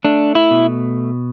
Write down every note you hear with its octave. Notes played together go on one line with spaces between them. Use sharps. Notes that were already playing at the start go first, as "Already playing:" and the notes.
A3 D4
E4
B2